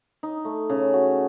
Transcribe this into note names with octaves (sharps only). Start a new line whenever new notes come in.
D#4
A3
C#3
F#4